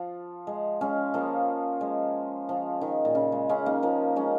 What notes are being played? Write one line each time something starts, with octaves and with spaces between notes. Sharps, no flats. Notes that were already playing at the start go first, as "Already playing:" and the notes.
Already playing: F3
G#3
G#3 C#4
F3 A#3
G#3
F3
D#3
A#2
C#3
G#3
G#3 C#4
A#3 D#4
F3 A#3
G#3 C#4